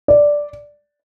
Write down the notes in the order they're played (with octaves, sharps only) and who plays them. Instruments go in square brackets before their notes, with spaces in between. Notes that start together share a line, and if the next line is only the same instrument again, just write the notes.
[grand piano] D5